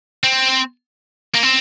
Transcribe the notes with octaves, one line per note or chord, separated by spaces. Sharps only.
C4
A#3
C4